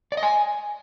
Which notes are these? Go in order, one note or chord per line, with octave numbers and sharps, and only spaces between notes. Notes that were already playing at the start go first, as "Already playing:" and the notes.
D5
D#5
G#5